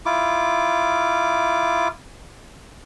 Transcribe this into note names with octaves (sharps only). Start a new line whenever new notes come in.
E4 F4 D6